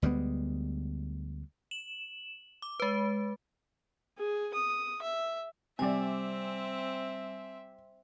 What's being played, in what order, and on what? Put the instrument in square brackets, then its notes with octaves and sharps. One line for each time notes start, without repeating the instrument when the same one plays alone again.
[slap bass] D2 G3 G#3 B3
[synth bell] E7 F#7
D6
G#3 B4
[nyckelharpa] G#4
D#6
E5
[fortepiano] C3 D5 [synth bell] G3 G#5 [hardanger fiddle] C4 E5